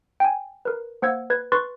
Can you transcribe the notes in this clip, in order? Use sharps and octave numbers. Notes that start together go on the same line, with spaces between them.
G5 G#5
A#4 B4
A#3 C5 F#5 E6 G#6
B4 G#6
B4 C6 C#6 F#6 A6